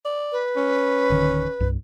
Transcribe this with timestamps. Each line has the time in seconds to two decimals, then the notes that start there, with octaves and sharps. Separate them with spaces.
0.05 D5
0.32 B4
0.56 C#4
1.10 D1 D3 D#3
1.60 C2 G2